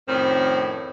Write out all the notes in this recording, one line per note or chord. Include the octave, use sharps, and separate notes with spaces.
F2 A2 D#3 C4 C#4